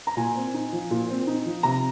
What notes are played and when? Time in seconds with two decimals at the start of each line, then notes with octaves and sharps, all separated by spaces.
0.07 A#5
0.17 A#2 G#5
0.35 C4
0.54 D#4
0.72 F3
0.91 A#2
1.09 C4
1.27 D#4
1.46 F3
1.63 C3 A#5